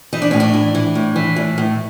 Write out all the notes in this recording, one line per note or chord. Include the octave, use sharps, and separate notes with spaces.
E3 D#4
D4
A2 C#4
D4
E3
E3
A2
E3
A2
A2